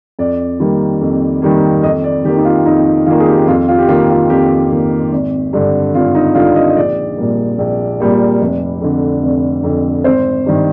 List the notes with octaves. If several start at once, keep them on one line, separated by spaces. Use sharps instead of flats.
F2 D5
D#3 G3 A#3
F2
D#3 G3 A#3
F2 D#5
D5
D#3 A#3 G4
D#4
F4
F2 D#4
D#3 A#3 F4
G#4
G4
F2 F4
F4
G4
D#3 A#3 F4
F4
F2 G4
D#3 A#3
G#1
G2 D3
G#1 F4
D#4
G2 D3 F4
D#5
D#5
A#1 D5
A#2 G3 A#3
A#1
A#2 G3 A#3
F1
F2 D3
F1
F2 D3
G#1 C5
G2 D#3